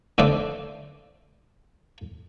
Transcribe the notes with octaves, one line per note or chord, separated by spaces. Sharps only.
D3 A3 A4 C5 D5